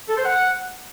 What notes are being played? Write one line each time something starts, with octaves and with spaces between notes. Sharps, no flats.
A4
C5
F#5